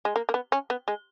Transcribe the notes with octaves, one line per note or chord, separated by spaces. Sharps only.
G#3
A#3
A#3
B3
C#4
B3
G#3